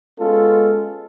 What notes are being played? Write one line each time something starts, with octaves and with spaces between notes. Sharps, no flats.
G#3 B3 C#4 F4 A4